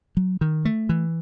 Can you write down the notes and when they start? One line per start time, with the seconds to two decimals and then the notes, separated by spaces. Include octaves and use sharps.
0.17 F#3
0.41 D#3
0.65 A3
0.89 E3